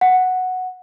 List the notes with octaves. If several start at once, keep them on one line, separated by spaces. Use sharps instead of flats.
F#5